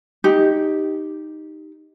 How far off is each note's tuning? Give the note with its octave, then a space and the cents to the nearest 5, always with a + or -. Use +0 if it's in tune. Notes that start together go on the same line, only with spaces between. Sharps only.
D#4 +0 G4 +0